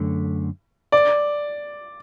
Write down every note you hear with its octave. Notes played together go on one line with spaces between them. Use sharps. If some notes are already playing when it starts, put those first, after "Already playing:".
Already playing: F#2 D3 A3
D5